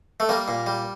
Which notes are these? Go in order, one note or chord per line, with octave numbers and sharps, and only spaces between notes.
A3
G3 A#3
A#2
G3